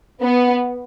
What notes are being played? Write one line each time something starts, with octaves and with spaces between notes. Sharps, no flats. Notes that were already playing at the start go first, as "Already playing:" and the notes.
B3